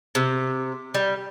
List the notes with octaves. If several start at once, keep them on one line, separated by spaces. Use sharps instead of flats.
C3
G3